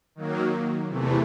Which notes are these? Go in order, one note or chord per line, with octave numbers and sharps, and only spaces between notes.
D#3 F#3 A#3
E2 C3 E3 A3